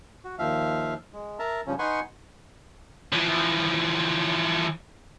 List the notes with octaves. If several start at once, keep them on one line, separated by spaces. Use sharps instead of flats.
F#4
D#2 F3 E5 F5
G#3
A#4 E5 A5 A#5
G2 C#3 F3 C#4
D#4 B4 F#5 G#5 C6 C#6
E3 F3